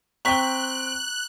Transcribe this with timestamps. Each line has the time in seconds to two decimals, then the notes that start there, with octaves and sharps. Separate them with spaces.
0.25 C4 G5 A#5 C#6 F#6 B6 G7